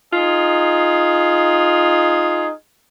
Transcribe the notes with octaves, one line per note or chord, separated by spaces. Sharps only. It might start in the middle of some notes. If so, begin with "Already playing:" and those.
D#4 F4 G#4